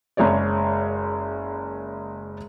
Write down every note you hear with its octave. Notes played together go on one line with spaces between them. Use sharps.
F#1 G#3 G#4 C#5 D5